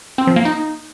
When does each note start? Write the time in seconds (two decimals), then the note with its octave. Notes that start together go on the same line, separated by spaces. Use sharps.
0.18 C4
0.27 F3
0.36 A#3
0.45 D#4